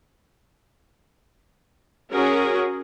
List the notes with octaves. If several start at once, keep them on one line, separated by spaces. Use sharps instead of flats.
C#4 F#4 G#4 A#4